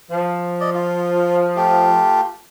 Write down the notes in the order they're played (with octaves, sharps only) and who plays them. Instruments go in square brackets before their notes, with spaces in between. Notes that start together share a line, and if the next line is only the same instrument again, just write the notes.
[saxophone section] F3
[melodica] D5 D#5
F4
A3 F4 G4